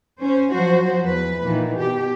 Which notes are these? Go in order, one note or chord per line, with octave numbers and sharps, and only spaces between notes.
C#4 C5
F3 F#3 F#4 C5
E2 B4
A#2 D#3 E3
B2 G4